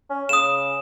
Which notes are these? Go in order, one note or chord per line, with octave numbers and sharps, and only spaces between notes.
C#4
C#3 D#6 E7